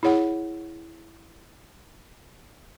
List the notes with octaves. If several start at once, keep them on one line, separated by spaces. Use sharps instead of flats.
E4 G#4 C#5 F#5